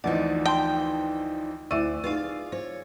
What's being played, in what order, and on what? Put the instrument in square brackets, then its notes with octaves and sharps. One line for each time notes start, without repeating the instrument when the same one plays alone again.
[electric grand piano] D2 E3 F3 [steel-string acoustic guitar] D#4 D5 [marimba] F#5
[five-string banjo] G5 [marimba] A5 C6
[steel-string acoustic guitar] D2 [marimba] E4 E5 C#6 [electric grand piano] D5 E6 D#7
[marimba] D#4 B4 [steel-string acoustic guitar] F4 G#4 F5
[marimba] C5 [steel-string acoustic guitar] C#5